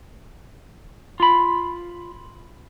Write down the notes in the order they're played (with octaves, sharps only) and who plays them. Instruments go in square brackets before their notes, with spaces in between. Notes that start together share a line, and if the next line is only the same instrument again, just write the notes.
[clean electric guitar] F4 B5